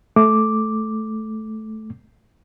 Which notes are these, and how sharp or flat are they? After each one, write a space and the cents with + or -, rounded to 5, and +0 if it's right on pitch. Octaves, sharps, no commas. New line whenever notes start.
A3 -10 D6 +0